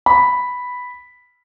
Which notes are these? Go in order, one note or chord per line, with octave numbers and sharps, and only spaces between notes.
B5